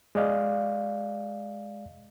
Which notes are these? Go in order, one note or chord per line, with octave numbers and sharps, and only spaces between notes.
G#3 D5 D#5 F5